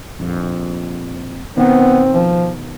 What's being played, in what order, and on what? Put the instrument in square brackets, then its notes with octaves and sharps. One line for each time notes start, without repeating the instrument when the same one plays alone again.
[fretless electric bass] A#1 F2
[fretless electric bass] B2 D#3 [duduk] B3 [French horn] C4
[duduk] F3